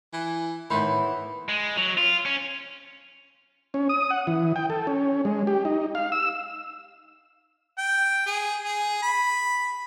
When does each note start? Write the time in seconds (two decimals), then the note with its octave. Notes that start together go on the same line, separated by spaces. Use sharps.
0.13 E3
0.70 A2 D#3 E3 A3 B3 C5 B5
1.49 G#3
1.77 F#3
1.98 F4
2.26 C#4
3.74 C#4
3.89 D#6
4.11 F#5
4.27 E3
4.56 G5
4.70 A4
4.87 C#4
5.25 G#3
5.47 G4
5.65 D#4
5.95 F5
6.12 E6
7.78 G5
8.26 G#4
8.62 G#4
9.03 B5